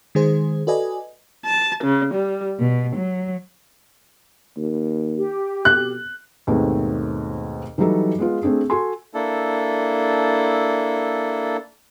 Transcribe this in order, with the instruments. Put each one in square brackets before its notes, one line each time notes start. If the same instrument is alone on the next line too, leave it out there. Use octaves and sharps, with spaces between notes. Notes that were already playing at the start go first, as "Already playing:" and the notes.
[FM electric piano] D#3 G#3 G#4 C5
F#4 A4 B4 D5 D#5 G#5
[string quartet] A5
C#3
G3
B2
F#3
[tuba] D#2
[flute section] G4
[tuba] B2 [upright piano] F#6
[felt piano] D#2 G#2 B2 A3 B3 C4
E3 F#3 G3 D#4 A4 B4
G#3 B3 F4
A3 C4 D4 G#4
F#4 A4 G#5 C6
[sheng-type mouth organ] A#3 D4 E4 A4